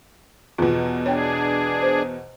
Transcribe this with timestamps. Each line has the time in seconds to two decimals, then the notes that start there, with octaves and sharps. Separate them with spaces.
0.58 E2 B2 F4
1.06 D4 G#4 C#5 G5
1.82 C5